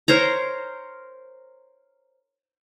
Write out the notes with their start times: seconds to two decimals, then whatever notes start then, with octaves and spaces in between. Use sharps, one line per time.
0.08 A#4 C5 C#5 A#5